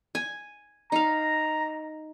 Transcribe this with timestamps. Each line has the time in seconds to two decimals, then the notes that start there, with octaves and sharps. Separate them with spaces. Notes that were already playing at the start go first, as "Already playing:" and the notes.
0.15 G#5
0.92 D#4 F5 A#5